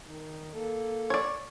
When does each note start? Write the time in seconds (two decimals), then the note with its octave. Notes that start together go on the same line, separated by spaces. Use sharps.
0.07 D#3 D#4
0.53 A#3 A4
1.10 C#5 D5